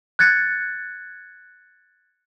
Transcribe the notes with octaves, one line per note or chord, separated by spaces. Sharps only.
F#6 G#6 A6 C#7